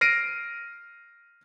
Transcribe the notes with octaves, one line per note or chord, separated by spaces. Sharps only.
F6 A#6 C7 D7 D#7